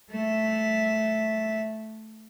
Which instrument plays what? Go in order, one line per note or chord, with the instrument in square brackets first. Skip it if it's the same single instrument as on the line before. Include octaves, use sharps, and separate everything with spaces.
[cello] A3 E5